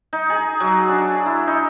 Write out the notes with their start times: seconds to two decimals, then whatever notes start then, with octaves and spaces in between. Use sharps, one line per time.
0.13 D#4
0.30 G#4
0.60 F#3
0.90 D4
1.26 E4
1.47 D#4